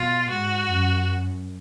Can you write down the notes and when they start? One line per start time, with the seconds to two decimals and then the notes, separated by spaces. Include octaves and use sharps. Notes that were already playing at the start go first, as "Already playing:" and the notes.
Already playing: B2 F4
0.30 G#2 F#4
0.68 F#2